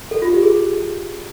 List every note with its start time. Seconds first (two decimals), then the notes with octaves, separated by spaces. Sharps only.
0.11 A4
0.22 F4
0.33 G4
0.43 G#4